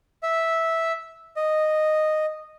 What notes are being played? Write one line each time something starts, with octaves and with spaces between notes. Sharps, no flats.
E5
D#5